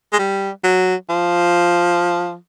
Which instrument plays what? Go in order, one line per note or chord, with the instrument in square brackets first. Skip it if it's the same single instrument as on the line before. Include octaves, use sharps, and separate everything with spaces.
[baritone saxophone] G#3
G3
F#3
F3